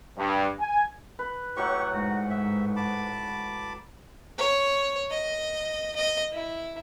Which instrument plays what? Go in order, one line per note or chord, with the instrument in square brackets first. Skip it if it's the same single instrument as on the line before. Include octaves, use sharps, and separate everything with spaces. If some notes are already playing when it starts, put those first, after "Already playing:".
[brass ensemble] G2
G#5
[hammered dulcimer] B4
[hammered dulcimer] A2 F#3 F#5 [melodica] G4 C#6
[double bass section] G#2 [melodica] F#4
[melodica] E5
A5 B5 D6
[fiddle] C#5
D#5
D#5
E4